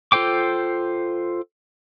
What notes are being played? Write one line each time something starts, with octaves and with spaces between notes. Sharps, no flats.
F4 A4 C5 G5 D6